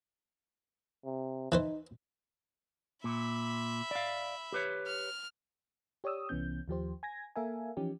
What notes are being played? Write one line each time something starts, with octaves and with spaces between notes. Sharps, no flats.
C3
E3 D#4 B4 C5
A#2 E5 B5
D5 F5
G4 B4 C#5
F6
G4 C#5 D5 D#6 E6
C2 E3 B3 C#4 G6
D#2 F3 G4 C5
G#5 G#6 A#6
A#3 A4 A#4 E5 F5 G#5
E3 F3 C#4 D#4 G4